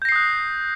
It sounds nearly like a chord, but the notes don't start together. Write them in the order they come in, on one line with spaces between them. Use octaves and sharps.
G6 A#6 C7 D#6 F#6